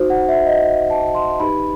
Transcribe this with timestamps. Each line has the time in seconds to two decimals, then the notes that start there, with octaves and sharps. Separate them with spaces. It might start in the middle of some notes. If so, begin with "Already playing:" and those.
Already playing: D#4 F#4 C5
0.10 F#5
0.29 E5
0.47 D#5
0.66 E5
0.90 A5
1.15 C6
1.40 D#4 G4 B4 B5